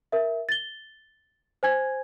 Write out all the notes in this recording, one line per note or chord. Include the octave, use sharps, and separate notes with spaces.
A#4 E5
A6 G7
C5 G#5 G#6